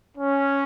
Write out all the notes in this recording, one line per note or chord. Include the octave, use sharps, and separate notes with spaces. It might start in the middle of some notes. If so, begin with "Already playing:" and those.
C#4